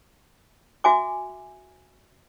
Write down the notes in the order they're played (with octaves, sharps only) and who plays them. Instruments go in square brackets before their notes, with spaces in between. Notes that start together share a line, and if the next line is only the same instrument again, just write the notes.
[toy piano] F#4 E5 G#5 D6